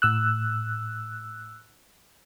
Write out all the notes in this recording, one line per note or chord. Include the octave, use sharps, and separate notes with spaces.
A2 E6 F#6